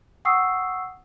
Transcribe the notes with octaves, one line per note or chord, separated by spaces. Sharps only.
F#5 G5 C#6 D#6 E6 C7